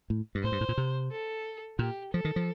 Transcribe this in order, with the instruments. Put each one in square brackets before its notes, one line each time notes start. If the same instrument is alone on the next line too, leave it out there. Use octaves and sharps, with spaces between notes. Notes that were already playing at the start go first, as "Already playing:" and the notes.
[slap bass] A2
G2
[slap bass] A2 [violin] C5
[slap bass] G2
A2
A#2
C3
[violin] A4
[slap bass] A#2 [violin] G4
[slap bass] F3 [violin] A4
[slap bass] D#3
F3